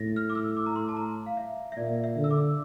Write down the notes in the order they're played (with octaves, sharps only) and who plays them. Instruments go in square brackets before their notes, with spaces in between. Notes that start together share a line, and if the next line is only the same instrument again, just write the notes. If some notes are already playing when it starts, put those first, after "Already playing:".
Already playing: [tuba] A2 [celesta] A6 A#6
[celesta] F6
D6
E6
D6
A#5
C6
A5
A#5
F5
E5
E5
[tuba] A#2 [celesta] D5
[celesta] E5
[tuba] D3
[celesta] E6
D6